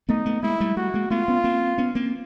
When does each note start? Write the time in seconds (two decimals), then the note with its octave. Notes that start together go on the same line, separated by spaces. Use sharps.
0.09 A3 B3 D#4
0.26 A3 B3
0.43 G#3 A#3 E4
0.60 G3 A3
0.76 G3 A3 F#4
0.94 G#3 A#3
1.10 A3 B3 F4
1.28 B3 C#4
1.44 A#3 C4
1.78 B3 C#4
1.95 A#3 C4